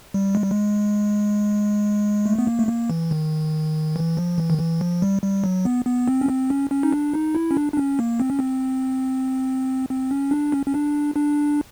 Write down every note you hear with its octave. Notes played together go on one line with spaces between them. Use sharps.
G3
G#3
G3
G#3
A3
B3
A#3
A3
A#3
E3
D#3
E3
F3
E3
D#3
E3
F3
G3
G3
F#3
B3
B3
C4
C#4
C4
C#4
C#4
D#4
D4
D#4
E4
C#4
D4
D4
C#4
A#3
C4
C#4
C4
C4
C#4
D4
C#4
C#4
D4
D4